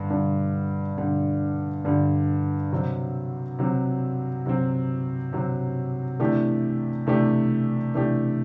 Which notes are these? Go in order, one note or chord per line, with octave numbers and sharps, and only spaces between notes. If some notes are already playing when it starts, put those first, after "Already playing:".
Already playing: G2 D3 G3
G2 D3 G3
G2 D3 G3
G2 D3 G3
C3 F#3 C4
C3 F#3 C4
C3 F#3 C4
C3 F#3 C4
C3 E3 A3 D4 G4
C3 E3 A3 D4 G4
C3 E3 A3 D4 G4